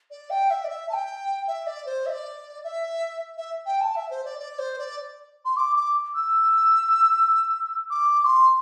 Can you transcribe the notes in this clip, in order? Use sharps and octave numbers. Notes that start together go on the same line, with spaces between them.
D5
G5
E5
D5
E5
A5
G5
E5
D5
C5
E5
D5
E5
E5
G5
A5
E5
C5
D5
D5
C5
D5
C6
D6
D6
E6
D6
D6
C6